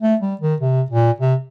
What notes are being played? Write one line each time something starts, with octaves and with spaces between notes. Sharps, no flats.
A3
G3
D#3
C3
A#2
C3